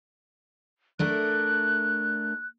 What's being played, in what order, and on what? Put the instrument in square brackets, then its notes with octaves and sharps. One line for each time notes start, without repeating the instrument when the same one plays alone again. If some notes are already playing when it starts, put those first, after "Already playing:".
[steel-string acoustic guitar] A3 D4 A#4 [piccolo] F#6